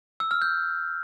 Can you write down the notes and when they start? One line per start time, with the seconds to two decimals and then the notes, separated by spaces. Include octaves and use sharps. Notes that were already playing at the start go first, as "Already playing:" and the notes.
0.20 E6
0.31 F6
0.42 G6